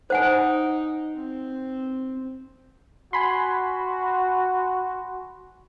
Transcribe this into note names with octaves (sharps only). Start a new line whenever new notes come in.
D#4 C5 F#5 G#5
C4
F#4 G#5 B5 C6